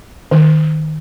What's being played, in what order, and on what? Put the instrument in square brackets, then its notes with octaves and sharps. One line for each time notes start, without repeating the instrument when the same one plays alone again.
[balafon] D#3